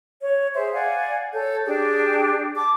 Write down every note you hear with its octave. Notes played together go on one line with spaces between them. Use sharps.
C#5
G#4 C5 E5
D5 F5 F#5 G#5
A4 C#5 G6
D4 G4 G#4
A5 D6